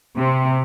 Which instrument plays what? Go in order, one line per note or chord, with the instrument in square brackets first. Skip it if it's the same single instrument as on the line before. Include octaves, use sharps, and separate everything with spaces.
[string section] C3